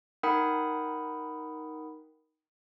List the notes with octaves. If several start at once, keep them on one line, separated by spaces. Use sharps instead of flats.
D#4 A#4 F#5 G5 B5 D#6